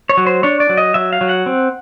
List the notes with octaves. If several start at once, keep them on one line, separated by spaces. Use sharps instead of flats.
C#5
F#3
C5
D4 C#5
D5
F#3
D#5
F#3 E5
F5
F#3
F#5
C4